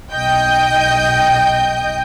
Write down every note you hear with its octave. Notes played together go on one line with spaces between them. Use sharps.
B1 D#5 G5 G6